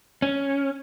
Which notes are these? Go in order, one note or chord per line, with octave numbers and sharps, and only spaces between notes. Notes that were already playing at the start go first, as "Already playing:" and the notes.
C#4